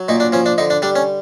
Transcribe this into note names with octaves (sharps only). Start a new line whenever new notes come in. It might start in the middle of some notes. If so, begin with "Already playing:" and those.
Already playing: F#3
A#2 D#4
D4
F3 C#4
D4
D3 D#4
D4
G3 D4
C#4